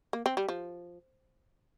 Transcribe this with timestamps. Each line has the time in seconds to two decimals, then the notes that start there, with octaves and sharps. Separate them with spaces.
0.13 A#3
0.26 C4
0.37 G3
0.49 F3